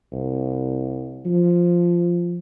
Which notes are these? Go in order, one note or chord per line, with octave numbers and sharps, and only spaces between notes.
C2
F3